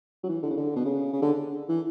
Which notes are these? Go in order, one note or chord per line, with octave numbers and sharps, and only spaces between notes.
F#3
E3
D3
C#3
D3
B2
C#3
C#3
D3
E3